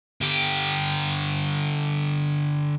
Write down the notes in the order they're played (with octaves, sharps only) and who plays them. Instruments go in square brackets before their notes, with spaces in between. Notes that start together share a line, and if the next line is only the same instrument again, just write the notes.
[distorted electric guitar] D3 G4